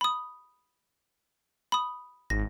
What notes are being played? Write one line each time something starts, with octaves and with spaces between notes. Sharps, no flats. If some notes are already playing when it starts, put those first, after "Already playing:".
B5 D#6
B5 D#6
G#1 A#6